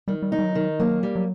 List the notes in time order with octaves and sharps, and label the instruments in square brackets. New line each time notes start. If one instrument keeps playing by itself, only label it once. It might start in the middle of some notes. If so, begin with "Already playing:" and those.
[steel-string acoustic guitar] D#3 [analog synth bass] G3
[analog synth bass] G3
[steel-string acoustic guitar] D#4
[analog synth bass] G3
F#3
[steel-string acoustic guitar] D#3
[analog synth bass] F#3 [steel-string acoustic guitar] A#3
[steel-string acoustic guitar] G3
[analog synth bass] F#3